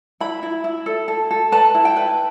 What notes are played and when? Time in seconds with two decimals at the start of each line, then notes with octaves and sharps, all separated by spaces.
0.20 E4 B5
0.43 E4
0.64 E4
0.86 A4
1.08 A4
1.31 A4
1.52 B4 A5
1.74 E4
1.85 G5
1.96 B4